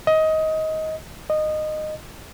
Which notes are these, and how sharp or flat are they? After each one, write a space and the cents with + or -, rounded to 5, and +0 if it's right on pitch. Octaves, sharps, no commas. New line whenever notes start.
D#5 +20
D#5 -15